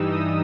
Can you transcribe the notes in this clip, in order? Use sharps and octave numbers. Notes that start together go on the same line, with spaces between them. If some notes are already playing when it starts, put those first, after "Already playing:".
Already playing: G2 E3 G3 D#4 E6
D#6